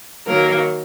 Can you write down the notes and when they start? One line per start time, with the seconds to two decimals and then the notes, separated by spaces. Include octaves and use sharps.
0.27 D#3 F#3 A#3 A#4